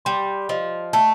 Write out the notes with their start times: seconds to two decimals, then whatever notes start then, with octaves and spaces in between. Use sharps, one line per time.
0.05 G3 C6
0.49 F3 D#5
0.93 A3 A5